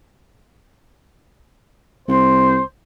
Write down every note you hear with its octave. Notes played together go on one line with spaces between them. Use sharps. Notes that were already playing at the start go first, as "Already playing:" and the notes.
C2 C5